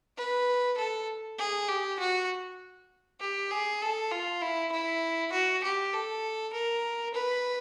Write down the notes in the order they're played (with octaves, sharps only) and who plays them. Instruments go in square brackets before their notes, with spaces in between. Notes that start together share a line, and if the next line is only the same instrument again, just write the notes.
[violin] B4
A4
G#4
G4
F#4
G4
G#4
A4
F4
E4
E4
F#4
G4
A4
A#4
B4